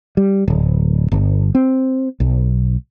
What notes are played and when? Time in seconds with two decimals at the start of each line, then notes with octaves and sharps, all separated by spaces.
0.17 G3
0.48 D1
1.12 G1
1.55 C4
2.20 B1